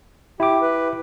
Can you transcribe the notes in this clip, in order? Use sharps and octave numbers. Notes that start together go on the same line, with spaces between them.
E4 G4 D6
B4